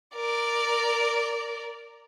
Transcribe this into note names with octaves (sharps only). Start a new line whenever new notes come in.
A#4 D5